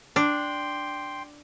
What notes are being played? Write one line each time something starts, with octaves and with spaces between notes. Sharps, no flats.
D4 G5 C6